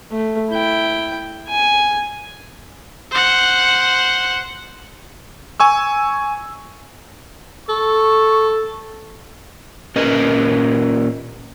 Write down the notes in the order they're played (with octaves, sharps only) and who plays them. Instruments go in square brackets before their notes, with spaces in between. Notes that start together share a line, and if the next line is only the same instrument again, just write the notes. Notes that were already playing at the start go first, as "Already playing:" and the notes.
[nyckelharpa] A3
E4 G5
G#5
[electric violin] C5 F#5
[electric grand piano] G#5 C#6 E6
[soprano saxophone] A4 [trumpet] C#6
[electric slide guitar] A#2 C#4 A#4 B4 D#5